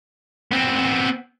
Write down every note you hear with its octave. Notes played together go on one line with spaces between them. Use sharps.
B3 C4